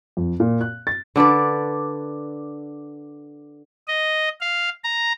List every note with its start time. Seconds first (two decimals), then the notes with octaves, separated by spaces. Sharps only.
0.17 F2
0.40 A#2
0.61 F#6
0.87 A6
1.16 D3 D4 B4 D5
3.88 D#5
4.41 F5
4.84 A#5